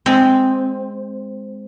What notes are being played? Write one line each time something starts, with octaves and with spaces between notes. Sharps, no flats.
G#3 C4